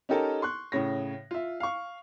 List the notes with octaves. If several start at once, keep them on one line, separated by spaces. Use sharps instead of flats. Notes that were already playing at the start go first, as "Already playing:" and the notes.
C#4 D#4 G4 A4 A#4 A5
C6 C#6 F#6
A2 C#3 C#5 A#6
F4 E5
F5 C#6